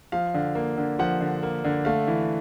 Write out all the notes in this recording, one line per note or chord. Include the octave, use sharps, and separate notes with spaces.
F3 F5
D3
A#3
D3
F3 F#5
D3
A#3
D3
A3 F5
E3